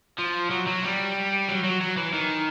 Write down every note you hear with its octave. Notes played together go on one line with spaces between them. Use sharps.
F3
F#3
F#3
G3
F#3
F#3
F#3
E3
D#3